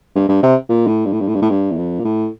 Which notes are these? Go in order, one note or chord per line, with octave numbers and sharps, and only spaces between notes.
G2
G2
C3
A#2
A2
G2
A2
G2
A2
G2
A2
G2
E2
F2
A#2
A2